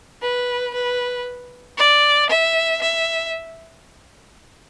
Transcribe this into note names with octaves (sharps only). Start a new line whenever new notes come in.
B4
B4
D5
E5
E5